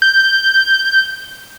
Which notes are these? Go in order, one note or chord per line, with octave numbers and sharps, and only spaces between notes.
G6